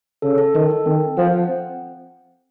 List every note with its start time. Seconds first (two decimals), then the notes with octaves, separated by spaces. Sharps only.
0.22 C#3 A4
0.38 A4
0.54 D#3 A4
0.71 A4
0.86 D#3 C4
1.01 A4
1.18 F3 F#5
1.33 F#5
1.49 C4